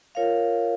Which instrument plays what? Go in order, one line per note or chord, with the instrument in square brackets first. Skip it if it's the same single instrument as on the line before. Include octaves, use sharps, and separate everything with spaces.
[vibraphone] F4 A#4 C#5 F5